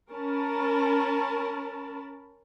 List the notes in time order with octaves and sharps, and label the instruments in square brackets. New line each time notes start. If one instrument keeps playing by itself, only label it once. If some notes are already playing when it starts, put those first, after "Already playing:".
[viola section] C#4 A#4 A5 B5